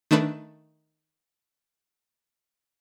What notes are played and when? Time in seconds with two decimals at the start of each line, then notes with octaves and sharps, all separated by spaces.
0.11 D#3 A3 D4 B4